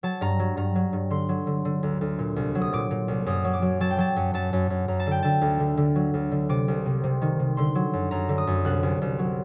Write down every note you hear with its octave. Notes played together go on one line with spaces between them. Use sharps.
F#3 A5
G2 A#5
F#3
G2 A#5
F#3
G2
D3 C6
F#3
D3
D3
D2
D2
A#2
C2
F#3
D#6
A#2 D6
A#2
C2
F#2 D#6
F#3
D6
F#3
F#3 A5
G5
F#3 A5
F#2
F#2 A5
F#2
F#2
F#2 A#5
A5
D3 G5
D3 A5
D2
D3
D3
F#3
D2
D3
C3 D6
C2
C3
C3
D#3
C3
D3 C6
F#3
F#2
F#2 A#5
D3
D#6
F#2
C2 F#6
C2
C2
F#3